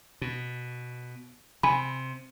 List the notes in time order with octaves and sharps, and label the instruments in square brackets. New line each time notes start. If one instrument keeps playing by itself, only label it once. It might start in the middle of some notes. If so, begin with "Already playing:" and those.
[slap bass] B2
[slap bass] C3 [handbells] G#5 B5